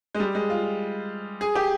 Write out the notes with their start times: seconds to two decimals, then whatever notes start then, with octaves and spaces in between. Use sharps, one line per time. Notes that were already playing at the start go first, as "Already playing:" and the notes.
0.15 G#3
0.20 G3
0.35 G#3
0.50 F4
1.41 G#4
1.55 G4